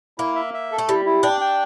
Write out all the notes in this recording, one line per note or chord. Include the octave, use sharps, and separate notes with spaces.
A#3 E4
E5
E5
A4
A3
G3 E4
E4
D4 G5
G5